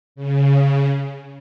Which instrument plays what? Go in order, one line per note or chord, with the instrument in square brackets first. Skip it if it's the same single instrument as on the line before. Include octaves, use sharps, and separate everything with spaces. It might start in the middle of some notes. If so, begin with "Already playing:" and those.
[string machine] C#3